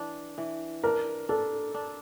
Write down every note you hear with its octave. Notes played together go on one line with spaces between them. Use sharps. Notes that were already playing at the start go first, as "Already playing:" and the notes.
Already playing: E3 D4
E3
D4 A#4
D4 A4
D4